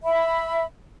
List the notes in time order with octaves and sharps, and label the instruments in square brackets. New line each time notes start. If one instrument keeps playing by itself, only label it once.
[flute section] E5 B5